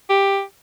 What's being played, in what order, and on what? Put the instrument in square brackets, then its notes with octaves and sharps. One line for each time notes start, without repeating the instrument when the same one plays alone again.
[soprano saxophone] G4